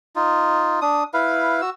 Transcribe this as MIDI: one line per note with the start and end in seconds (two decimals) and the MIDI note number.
0.16 0.80 63
0.16 0.80 65
0.82 1.04 62
0.82 1.04 87
1.14 1.61 64
1.14 1.61 71
1.14 1.61 77
1.62 1.70 66
1.62 1.70 88